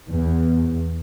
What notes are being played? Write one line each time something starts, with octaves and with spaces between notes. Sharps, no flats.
E2